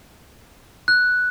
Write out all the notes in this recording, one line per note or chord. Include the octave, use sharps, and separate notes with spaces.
F#6